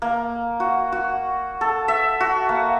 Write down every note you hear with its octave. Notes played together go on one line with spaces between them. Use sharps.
A#3
F#4
F#4
A4
E5
F#4
A#3